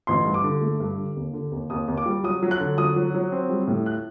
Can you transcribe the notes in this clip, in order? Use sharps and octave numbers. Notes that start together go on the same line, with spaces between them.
A1 C6
G2
D6
D3
A3
G2
D3
D#2
D3
D#2
D#2 D#6
D#2
D6
G3
F#3 D#6
F#3
F#6
D3
F#3 D#6
F#3
F#3
C4
G3
A2
F#6